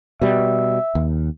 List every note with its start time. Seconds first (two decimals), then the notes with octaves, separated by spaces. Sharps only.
0.22 B2 G3 E5
0.95 D#2